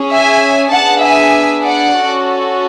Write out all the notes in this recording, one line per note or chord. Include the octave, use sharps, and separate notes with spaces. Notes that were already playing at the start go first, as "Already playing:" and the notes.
Already playing: C#4 G#4
E5 G#5
B3 D4 G#4 F#5 A5
E5 G#5
D5 F#5
C#4 F#4 A4